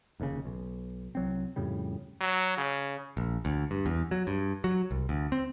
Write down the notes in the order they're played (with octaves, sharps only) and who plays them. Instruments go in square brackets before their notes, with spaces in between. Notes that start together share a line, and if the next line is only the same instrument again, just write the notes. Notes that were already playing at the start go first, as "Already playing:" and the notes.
[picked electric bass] F1 D#2 G#2 C#3
B1
C2 F#3 C4
F2 A2 C#3 G3
[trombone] F#3
C#3
[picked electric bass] A#1
D2
G2
E2
F#3
G2
F#3
C2
D2
C4